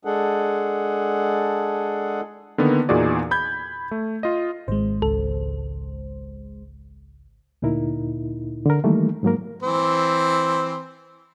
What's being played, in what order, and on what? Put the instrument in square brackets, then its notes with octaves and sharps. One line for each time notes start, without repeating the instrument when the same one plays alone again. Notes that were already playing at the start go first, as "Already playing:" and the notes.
[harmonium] G#3 D4 G#4 A4 F#5
[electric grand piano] D3 D#3 A#3 B3
E2 A#2 D#4 F#4 G#4 D5
B5 G6 G#6
A3
F4 D#5
[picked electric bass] G#1 [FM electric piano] G#3 C5
[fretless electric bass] C#2 [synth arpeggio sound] A4
[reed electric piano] D2 A#2 D#4 E4 A#4
D3 A#4
D#3 E3 G3 A3 A#3
G#2 F#3 A#3 A#4
[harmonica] E3 C4 C5